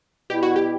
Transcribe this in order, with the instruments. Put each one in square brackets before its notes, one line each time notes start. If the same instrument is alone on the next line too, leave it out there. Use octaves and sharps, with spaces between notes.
[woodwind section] B2 G3 B3 E4 [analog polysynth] G4
[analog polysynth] F#4
G4